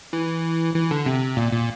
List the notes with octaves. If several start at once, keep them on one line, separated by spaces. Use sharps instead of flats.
E3
E3
D3
C3
A#2
A#2